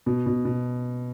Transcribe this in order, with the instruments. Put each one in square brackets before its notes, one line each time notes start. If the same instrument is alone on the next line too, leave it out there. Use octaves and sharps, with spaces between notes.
[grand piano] B2
B2
B2